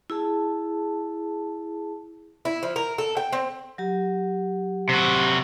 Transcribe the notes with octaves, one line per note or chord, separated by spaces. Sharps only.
E4 G#4 A5
E4
F3
A#4
A4
G5
C4
F#3 G4
C3 F#4